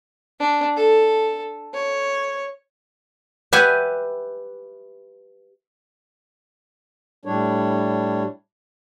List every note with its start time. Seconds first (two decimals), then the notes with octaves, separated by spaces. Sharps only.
0.39 D4
0.76 A4
1.74 C#5
3.53 G4 B4 E5 F#5 G#5
7.25 A2 G3 D4 C#5